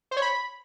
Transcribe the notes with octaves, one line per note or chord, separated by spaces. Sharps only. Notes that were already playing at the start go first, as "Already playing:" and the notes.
C5
C#5
B5